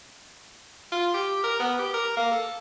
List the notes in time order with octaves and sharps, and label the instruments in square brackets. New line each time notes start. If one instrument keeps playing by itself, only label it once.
[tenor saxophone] F4
G4
A#4
B3
G4
A#4
A#3
A4